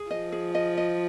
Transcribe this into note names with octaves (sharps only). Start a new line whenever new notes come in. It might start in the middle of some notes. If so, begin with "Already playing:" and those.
Already playing: G#4
F3 D#5
G#4
D#5
D#5